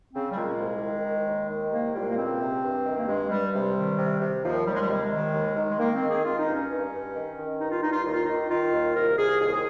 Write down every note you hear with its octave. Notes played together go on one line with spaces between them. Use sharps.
C#3 C4
G3
A#2 G#3
C2
D#3
D#3
D#2
D#3
C2 A#3
A#2 G3
G#3
A#3
C#2 C4
C3
G2
D#3
A#3
G2 G#3
G2 G3
C3 G3
D#3
C3
C3
D#2 F3
D#2 G3
G#3
G3
C3 G#3
D#3
D#2
D#3
G#3
D#3 A#3
C4
D#3
G#4
D#3 F4
D#4
G2
C#4
G2
G2
D#3
D#3
G2 D#4
F4
G2 D#4
F4
D#2 D#4
F4
D#3 D#4
D#3 F4
D#2
C2 A#4
C2 G#4
D#2 G#4